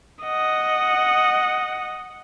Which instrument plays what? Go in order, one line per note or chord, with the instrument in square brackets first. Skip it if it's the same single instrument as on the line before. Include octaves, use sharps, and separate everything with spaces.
[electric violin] D#5 F#5